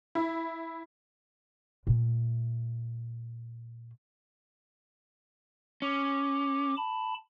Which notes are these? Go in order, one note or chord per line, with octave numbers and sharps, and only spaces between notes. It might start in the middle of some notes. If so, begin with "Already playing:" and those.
E4
A#2 A3
C#4 D6
A5 B5